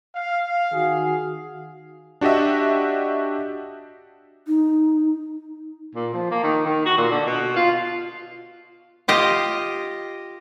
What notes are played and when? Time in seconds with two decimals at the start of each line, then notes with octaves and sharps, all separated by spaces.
0.15 F5
0.72 D#3 F#4 G#4
2.21 D4 F#4 G4 D#5 E5
4.47 D#4
5.95 A#2
6.14 F3
6.31 A#3
6.43 D#3
6.66 D#3
6.86 F#4
6.97 A#2
7.11 D3
7.27 B2
7.56 F4
9.08 F4 G4 D#5